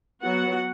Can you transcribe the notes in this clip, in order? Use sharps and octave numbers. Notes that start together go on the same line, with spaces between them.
F#3 B3 F#4 F#5